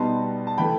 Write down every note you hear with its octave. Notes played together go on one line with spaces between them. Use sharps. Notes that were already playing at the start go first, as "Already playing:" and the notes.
Already playing: B2 G3 B3 D#4 A5 C6
A5
E3 A3 G5 B5